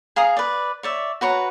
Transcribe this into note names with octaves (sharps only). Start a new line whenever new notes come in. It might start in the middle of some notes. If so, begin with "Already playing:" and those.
G#4 F5 A#5 D#6
B4 D5
C#5 D5 E5
F#4 B4 C#5 A#5